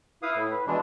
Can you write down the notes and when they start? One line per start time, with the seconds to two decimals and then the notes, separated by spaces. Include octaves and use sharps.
0.22 E4 B4 F5 D#6
0.35 A2
0.50 B4
0.67 B2 E3 G#3 D4